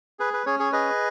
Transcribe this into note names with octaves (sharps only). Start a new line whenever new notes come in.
G#4 B4
B4
C#4 G#4 C#5
G#4 C#5
G#4 B4 D#5